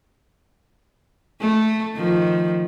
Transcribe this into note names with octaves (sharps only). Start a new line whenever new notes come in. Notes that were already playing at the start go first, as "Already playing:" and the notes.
A3
D#3 F3